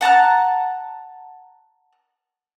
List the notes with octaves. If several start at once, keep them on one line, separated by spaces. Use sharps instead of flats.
F#5 A5 A#5 F#6